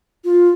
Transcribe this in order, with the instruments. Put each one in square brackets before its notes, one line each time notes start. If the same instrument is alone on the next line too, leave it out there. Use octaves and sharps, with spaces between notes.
[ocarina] F4